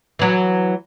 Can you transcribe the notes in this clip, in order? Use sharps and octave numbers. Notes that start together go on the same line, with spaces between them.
E3 F#3